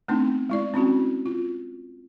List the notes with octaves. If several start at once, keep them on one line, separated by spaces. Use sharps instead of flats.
A3 B3 C4 D4 D#4
G#3 E4 D5
C4 C#4 E4 F#4
F4